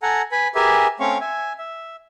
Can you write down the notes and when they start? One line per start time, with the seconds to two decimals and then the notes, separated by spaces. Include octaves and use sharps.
0.02 A4 F#5 G#5 A#5
0.32 B4 G#5 B5
0.55 G4 G#4 A#4 B4 E5 G#5
1.00 A3 C4 C#4 C#5 F5 C#6
1.20 E5 G#5
1.58 E5